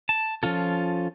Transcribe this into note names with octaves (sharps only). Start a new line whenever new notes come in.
A5
F3 C#4 F4 A4